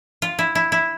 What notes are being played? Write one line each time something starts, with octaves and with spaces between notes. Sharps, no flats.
F4
E4
E4
E4